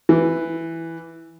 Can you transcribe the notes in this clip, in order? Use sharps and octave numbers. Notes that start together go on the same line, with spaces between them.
E3